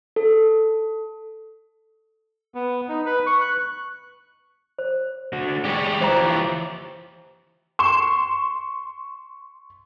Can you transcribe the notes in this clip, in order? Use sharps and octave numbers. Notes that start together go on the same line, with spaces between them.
A4
B3
D#4
B4
C#6
F#6
C5
D3 F#4
G3 G#3 G4 C#5
E3 F3 C5 A#5
C6 C#6 E7